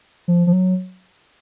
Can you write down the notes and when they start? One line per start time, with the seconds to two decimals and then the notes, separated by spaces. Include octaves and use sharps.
0.28 F3
0.47 F3
0.52 F#3